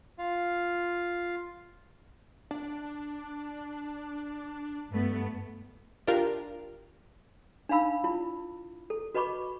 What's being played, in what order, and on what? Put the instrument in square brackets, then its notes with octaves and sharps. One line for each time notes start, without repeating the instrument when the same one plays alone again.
[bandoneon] F4 F5
[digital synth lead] D4
[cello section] G2 A3 B3
[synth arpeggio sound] D4 F4 G4 A#4 F5
[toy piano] D4 D#4 F5 B5 E6
E4 F4
A4
F#4 B4 D#5 B5 C#6 D6